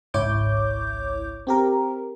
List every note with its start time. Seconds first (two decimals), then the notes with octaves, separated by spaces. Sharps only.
0.14 G#1 C#2 E4 C#5 D6 G6
1.47 C4 G4 A#4